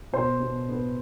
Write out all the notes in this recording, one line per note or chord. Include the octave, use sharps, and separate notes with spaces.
B2 C5
B2
B3